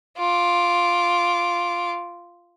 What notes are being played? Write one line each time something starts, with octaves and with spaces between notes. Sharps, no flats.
F4 D6